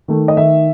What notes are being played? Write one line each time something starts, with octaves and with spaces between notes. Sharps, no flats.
D#3 A3
D#5
D#3 E5